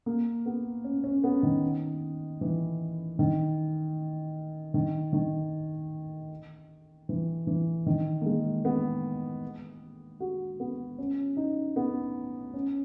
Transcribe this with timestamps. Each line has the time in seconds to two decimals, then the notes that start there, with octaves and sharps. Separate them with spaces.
0.06 A#3
0.46 B3
0.84 C#4
1.04 C#4
1.24 B3
1.43 D#3
2.41 E3
3.19 D#3
4.74 D#3
5.13 D#3
7.09 E3
7.47 E3
7.86 D#3
8.21 A#3
8.26 G#3
8.65 B3
10.20 F#4
10.60 B3
10.98 C#4
11.37 D#4
11.76 B3
12.54 C#4